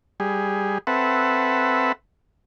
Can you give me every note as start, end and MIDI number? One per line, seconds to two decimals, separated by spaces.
0.20 0.78 55
0.20 0.78 68
0.87 1.92 60
0.87 1.92 69
0.87 1.92 71
0.87 1.92 76
0.87 1.92 78